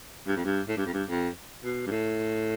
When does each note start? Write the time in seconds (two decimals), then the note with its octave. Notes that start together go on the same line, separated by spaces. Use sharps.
0.27 G2
0.36 F2
0.45 G2
0.68 A2
0.77 G2
0.86 F2
0.93 G2
1.09 F2
1.64 B2
1.86 G2
1.91 A2